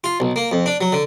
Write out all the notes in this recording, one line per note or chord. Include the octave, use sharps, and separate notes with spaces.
F4
B1
A#3
F2
D4
F#3
D3